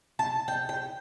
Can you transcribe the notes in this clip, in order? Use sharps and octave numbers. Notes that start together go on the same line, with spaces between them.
A5
G5
G5